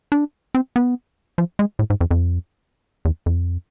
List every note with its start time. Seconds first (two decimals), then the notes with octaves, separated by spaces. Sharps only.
0.12 D4
0.55 C4
0.76 B3
1.38 F3
1.59 G#3
1.79 A2
1.90 G#2
2.01 F2
2.11 F2
3.05 E2
3.26 F2